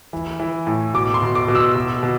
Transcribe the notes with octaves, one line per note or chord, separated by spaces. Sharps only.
E3
E3
A2
B2 D6
C6
B2
D6
B2
E6
B2
B2